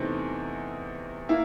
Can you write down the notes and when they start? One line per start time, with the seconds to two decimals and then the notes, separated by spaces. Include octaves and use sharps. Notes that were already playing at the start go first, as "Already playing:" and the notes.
Already playing: E2 C3 E3 A3 C4 D#4
1.29 A#3 E4